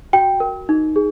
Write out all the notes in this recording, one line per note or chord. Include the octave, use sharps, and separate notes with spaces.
F#4 G5
A#4
D#4
G#4